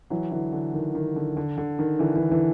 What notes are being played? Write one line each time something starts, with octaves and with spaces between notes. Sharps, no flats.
E3 F#3
D3 E3
D3
D#3
D#3
D3
D3
D3
D#3
D3 E3
D3 E3
D3 E3